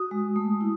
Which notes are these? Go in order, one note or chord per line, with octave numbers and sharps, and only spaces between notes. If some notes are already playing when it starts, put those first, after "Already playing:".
Already playing: F#4 D#6
G#3
A3
E4